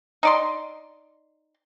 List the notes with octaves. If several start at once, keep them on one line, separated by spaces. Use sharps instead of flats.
D#4 D5 C6